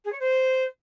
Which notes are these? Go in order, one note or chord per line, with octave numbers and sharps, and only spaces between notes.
G#4
C#5
C5